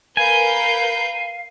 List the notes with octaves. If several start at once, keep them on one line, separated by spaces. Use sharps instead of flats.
A#4 B4 F5 G#5 G6